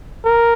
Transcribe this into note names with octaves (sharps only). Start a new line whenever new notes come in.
A#4